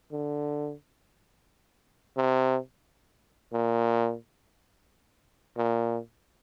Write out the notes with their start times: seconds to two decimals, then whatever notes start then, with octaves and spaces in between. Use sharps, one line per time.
0.12 D3
2.17 C3
3.53 A#2
5.57 A#2